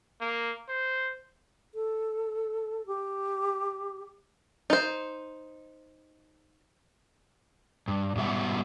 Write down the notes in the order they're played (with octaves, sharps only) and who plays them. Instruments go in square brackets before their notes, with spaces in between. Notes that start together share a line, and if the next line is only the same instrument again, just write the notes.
[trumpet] A#3
C5
[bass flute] A4
G4
[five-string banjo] D#4 C5
[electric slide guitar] G2
G#2 B2 G3 E5 F#5